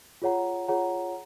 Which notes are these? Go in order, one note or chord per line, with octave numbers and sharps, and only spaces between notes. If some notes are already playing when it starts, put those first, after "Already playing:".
F4 G#4 C#5 F#5 A#5
F4 G#4 C#5 F#5 A#5